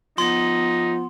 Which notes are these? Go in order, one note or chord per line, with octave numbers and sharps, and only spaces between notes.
F3 B3 D#4 C6